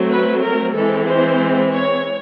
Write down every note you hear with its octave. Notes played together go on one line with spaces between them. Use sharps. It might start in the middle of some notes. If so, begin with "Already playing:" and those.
Already playing: F#3 A3 C4
B4
A#4
E3 G#3 C4 A4
C5
C#5